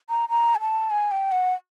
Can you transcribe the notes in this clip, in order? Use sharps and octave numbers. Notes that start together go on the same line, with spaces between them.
A#5
A#5
G#5
A5
G#5
G5
F#5